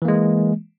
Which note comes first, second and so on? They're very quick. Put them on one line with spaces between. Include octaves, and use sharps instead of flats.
E3 A#3 G#3